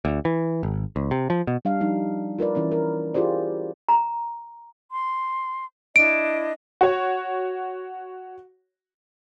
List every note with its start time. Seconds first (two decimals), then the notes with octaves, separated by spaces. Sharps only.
0.05 D2
0.25 E3
0.63 G#1
0.96 C#2
1.11 C3
1.30 F3
1.47 B2
1.65 G3 D4 F5
1.80 F3 G3 D#4
2.39 F4 A#4 B4 D5
2.55 E3 C#4 E4 D5
2.72 A#4
3.14 E4 F4 G4 G#4 C5 D5
3.89 A#5
4.91 C6
5.96 D4 E4 D#5 D7
6.81 F#4 C#5